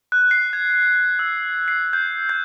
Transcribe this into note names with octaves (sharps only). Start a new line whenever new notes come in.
F#6
C7
G#6
E6
C7
G6
G6